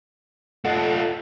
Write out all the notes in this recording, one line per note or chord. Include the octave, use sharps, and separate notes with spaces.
A3 F4 A4 D#5 F#5